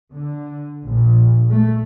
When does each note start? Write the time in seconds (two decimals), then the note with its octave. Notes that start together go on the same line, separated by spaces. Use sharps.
0.12 D3
0.84 A#1
1.49 A3